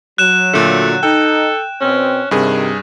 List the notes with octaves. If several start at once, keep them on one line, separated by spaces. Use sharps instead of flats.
F#3 F#6 E7
A#2 D3 A3
D#4 A4 G5
B2 C4 C#4
G2 C3 D#3 G#4